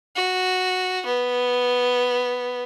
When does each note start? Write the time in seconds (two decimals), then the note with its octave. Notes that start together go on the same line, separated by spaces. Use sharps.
0.16 F#4
1.06 B3